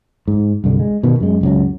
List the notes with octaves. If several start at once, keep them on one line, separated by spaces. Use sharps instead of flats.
G#2
C2 G2 D3
G#3
B2 D#3 B3
F#2 G#3
F#1 C#2 F#3